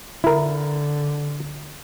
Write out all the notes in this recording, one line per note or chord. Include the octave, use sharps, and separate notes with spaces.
D3 E4 A#4